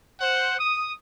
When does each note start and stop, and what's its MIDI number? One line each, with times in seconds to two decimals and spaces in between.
0.20 0.57 72
0.20 0.57 78
0.59 0.93 87